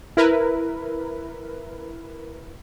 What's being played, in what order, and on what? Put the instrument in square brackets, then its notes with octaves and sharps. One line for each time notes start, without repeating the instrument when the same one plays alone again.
[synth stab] E4 A#4 B4